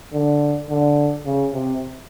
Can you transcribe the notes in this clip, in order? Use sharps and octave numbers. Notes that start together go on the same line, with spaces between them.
D3
D3
C#3
C3